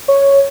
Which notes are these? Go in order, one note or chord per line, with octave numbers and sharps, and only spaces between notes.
C#5